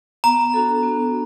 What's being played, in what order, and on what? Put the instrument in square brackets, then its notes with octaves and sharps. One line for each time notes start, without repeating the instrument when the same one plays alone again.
[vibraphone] B3 [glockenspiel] A#5
[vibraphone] D4 F#4 A4
B3